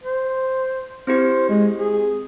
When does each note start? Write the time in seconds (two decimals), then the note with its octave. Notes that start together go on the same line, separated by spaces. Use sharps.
0.04 C5
1.07 C4 E4 G4 C5
1.49 G#3
1.77 G#4